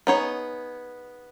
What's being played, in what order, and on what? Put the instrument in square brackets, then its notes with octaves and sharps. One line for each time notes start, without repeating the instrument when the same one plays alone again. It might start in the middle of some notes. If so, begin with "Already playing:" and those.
[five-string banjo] B3 D#4 G#4 C#5